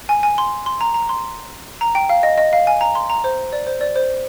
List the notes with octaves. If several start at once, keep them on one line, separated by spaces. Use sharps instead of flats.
G#5
G#5
C6
C6
A#5
A#5
C6
A#5
G5
F5
D#5
D#5
F5
G#5
A#5
C6
A#5
C5
D5
C5
D5
C5